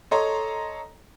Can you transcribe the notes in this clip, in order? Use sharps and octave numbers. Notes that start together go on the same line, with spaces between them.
A4 C#5 D#5 A#5 C6